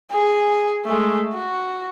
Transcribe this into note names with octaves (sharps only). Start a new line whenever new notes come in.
G#4
G#3 A3
F#4